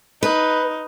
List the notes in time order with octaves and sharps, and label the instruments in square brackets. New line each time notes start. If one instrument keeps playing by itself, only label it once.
[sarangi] D#4 [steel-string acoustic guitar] B4